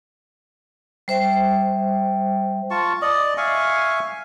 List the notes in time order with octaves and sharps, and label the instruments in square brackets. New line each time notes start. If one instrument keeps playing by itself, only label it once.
[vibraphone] G3 C5 E5 G5
[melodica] F4 A5 C#6
D5 D#5
E5 F5 G#5 C#6